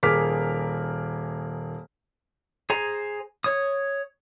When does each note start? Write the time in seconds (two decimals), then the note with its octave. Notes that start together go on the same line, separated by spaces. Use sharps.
0.03 D#1 G#4 A#4 D6 F6 B6
2.70 G#4 C5 G#5 A#5
3.44 C#5 D#6